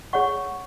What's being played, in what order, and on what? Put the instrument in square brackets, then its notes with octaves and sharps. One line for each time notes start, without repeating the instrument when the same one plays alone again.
[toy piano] G#4 C#5 F#5 C#6